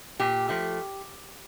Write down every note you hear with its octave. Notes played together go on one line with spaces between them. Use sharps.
A#2 G4
F3 A3